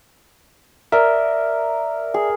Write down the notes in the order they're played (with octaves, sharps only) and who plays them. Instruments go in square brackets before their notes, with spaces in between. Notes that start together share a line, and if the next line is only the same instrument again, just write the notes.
[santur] A#4 [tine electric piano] D5 E5
[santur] G#4